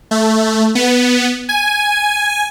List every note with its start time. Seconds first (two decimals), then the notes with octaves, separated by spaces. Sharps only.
0.11 A3
0.75 B3
1.49 G#5